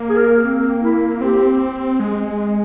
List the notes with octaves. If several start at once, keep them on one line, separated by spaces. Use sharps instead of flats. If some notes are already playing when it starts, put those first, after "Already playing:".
Already playing: A#3
G#4
A#4
C4
E4
C4 G4
G#3